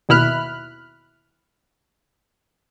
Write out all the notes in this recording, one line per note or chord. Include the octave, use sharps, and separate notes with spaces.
D#2 B2 E4 B5 F6 F#6